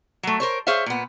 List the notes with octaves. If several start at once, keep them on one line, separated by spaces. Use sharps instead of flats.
F#3 A3
A#4 C5 C#5
G#4 C5 C#5 E5 F5
A#2 B3